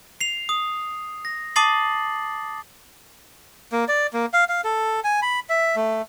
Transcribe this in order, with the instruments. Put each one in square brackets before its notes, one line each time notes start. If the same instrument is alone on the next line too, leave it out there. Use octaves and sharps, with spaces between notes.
[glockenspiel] C7 F7
D#6
A#6
A5 D6 D#6 A6 C7 F#7
[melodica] A#3
D5
A#3
F5
F5
A4
G#5
B5
E5
A3